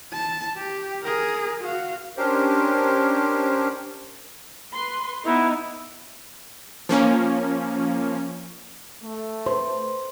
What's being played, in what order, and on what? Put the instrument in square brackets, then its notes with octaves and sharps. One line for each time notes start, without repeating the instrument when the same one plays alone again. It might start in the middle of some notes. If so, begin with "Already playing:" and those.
[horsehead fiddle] A5
G4
G#4 A#4
F#4 F5
[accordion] C#4 D4 G4 A#4 C5
[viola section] B4 C6
[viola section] B3 D#4 [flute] E4
[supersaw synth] F3 A#3 C#4
[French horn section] A3
[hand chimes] B4 C6 [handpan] C5